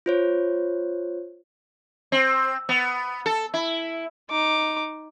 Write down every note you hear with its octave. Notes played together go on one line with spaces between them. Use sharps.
F4 C5 C#5
C4
B3
A4
E4
D#4 D6